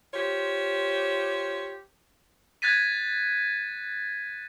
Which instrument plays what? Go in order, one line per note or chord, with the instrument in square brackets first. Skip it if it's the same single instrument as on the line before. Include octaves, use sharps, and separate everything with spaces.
[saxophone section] F4 G4 C5 C#5
[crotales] F#6 G#6 A6 B6 D#7